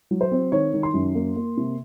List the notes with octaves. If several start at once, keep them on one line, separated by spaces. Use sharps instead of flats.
F#3
C5
C4
D#3 C#5
D#3
C6
F#2
A#3
A#3
C3